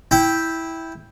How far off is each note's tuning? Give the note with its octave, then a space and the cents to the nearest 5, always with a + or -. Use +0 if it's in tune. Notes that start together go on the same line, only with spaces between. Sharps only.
E4 -10 G5 +0